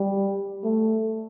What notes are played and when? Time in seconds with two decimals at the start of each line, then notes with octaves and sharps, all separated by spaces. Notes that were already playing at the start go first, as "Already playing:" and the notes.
Already playing: G3
0.64 A3